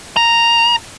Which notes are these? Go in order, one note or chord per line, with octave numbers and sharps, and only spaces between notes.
A#5